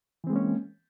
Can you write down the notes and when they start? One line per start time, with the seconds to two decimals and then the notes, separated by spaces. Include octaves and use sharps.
0.24 E3
0.27 C4
0.30 G#3
0.33 A#3
0.36 C#4